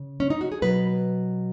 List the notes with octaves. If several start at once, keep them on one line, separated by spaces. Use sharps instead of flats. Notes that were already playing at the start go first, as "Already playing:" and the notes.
Already playing: C#3
C#4
D#4
F#4
G#4
B2 F#3 B3 B4